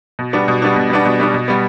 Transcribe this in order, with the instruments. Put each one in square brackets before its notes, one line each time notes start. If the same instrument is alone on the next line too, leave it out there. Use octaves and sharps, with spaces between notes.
[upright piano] B2
G3 B3 D4
B2
G3 B3 D4
B2
G3 B3 D4
B2
G3 B3 D4
B2
G3 B3